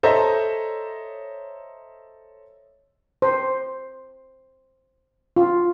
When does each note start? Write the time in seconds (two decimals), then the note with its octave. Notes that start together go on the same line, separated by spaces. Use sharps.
0.03 A4 C5 C#5 D#5 E5 A#5
3.22 C5
5.36 F4